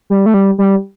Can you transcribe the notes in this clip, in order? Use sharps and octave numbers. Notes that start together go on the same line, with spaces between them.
G3
A3
G3
G3